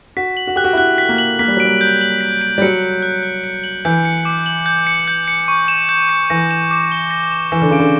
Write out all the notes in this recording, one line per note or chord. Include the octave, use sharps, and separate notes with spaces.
F#4 B6
F#7
F#4
G4 F#6
F#4
E4
F#4 F#6
B6
A#3
F#7
A#3 B6
G3
F#3 D7
G3
G6
F#7
B6
D7
G3
F#3 C#7
F#7
F#6
F#6
C#7
F#7
E3 G6
C#7
D6
F#7
G6
C#7
G6
C#7
C#6
E7
G6
C#7
E3 A#6
E7
D6
G7
A#6
E7
E3 A#6
D3
C#3 D7
D3